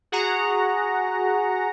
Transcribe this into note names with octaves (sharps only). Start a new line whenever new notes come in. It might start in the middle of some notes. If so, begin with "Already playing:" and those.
F#4 G#4 F#5 A#5